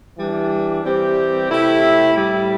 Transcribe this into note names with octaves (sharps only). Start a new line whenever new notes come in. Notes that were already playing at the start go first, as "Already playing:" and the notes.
E3 G3 D4
E3 G3 C4 G4
C3 A3 E4 G4
A2 G3 E4